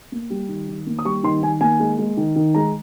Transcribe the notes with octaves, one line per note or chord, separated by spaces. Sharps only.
A#3
G3
D#3
D#3
A#3
D#6
G3 C#6
D#3 C6
D#3 G#5
A#3 G#5
G#3
G#3
D#3
D#3
G#3 A#5